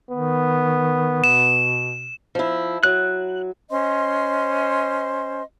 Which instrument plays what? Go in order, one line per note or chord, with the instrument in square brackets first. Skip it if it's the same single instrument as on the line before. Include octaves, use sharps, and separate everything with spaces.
[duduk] D#3 [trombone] B3
[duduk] B2 [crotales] E7
[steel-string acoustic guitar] F3 E4
[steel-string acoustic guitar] F#3 [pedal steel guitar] F#6
[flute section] C#4 C5 D#5 C6